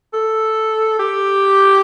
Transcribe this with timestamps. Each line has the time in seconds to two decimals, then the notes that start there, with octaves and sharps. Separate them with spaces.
0.14 A4
0.99 G4